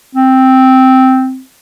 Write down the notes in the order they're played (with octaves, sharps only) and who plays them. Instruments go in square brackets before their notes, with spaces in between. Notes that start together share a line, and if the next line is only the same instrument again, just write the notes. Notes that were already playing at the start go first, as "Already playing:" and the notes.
[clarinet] C4